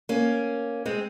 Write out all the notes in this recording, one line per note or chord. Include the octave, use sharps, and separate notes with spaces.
A#3 C#4
G#3 C4